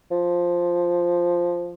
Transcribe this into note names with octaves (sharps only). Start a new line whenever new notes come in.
F3